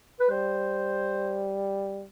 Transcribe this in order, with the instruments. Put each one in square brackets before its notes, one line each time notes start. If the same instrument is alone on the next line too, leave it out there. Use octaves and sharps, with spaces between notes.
[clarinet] B4
[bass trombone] G3 [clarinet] C5